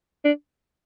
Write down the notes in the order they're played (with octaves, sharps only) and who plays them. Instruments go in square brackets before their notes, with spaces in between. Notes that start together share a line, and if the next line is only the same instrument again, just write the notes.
[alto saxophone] D4